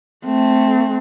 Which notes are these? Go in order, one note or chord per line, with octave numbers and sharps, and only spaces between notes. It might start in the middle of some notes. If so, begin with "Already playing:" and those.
A3 C4